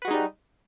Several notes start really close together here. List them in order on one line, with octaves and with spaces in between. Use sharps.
B4 F#4 G#3 D#4 G3